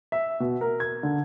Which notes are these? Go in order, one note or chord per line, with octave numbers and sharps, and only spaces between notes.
E5
B2
A#4
G#6
D3